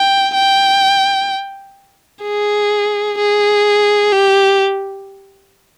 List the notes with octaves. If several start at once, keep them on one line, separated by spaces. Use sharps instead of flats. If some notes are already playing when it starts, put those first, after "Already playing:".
Already playing: G5
G5
G#4
G#4
G4